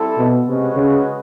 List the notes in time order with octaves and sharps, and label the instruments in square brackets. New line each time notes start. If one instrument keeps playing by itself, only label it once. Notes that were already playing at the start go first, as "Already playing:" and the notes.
Already playing: [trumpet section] G3 C4 E4 A4
[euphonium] B2
[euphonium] C3 [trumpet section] G#3 C#4 F#4 B4 D#5
[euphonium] C#3